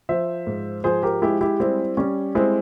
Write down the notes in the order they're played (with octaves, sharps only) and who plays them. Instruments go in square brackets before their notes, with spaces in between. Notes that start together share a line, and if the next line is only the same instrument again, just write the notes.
[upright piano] F3 C5 E5
G#2
F3 G#4 C5
G4 A#4
G#3 E4 G4
E4 G4
G3 C4 E4
G3 C#4
G#3 C4 E4